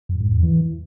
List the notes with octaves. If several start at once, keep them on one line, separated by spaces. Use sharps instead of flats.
F#2
G#2
E2
E3